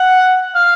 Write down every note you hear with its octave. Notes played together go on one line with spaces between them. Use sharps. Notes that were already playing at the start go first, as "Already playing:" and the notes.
Already playing: F#5
F5